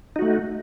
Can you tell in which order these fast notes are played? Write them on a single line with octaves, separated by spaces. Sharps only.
D#4 F#4 A3